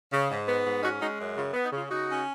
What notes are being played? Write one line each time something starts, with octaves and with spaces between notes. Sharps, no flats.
C#3
G#2
B3
G#2
C#4 D#4 F#4
G#3 D#4 F#4
F#2
C#3 F4
B3
D#4
C#3 F4
C#3 D#4 F#4
C#4